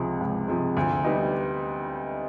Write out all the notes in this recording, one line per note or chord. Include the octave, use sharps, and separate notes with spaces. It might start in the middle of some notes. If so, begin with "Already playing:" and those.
Already playing: C#2 C3 F3 G#3
C#2
C3 F3 G#3
D2
G3 B3 D#4